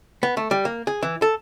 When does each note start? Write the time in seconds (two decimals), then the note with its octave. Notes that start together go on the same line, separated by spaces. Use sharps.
0.23 B3
0.37 A3
0.51 G3
0.65 A#3
0.87 G#4
1.03 E3
1.22 A4